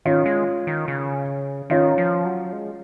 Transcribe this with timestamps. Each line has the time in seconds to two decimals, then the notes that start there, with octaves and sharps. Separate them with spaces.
0.05 D#3 C#4 F4
0.26 G#3
0.67 D#3
0.88 C#3
1.70 D#3 C#4 F4
1.98 F3
2.25 F#3
2.53 G#3